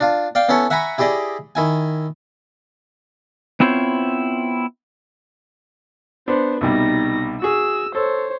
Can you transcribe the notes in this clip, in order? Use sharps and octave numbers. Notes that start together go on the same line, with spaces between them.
D4 F4
D5 F5 G5
B3 C#4 E4 A4 C#5
E5 F#5 G#5 A#5 B5 C#6
E4 G4 G#4 D5 D#5
D#3 E4 G#5
B3 C4 E4 F4 C5 C#5
B3 D4 C5
C2 B2 G3 D#4 A#6
F#4 G#4 E6
A4 C5 C#5